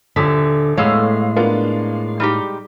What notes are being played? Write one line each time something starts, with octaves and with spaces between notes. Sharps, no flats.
D#1 D3 B6
A2 G#3 B3 A4 C#5 F5
A#3 B3 D4 F4
G3 D#4 G4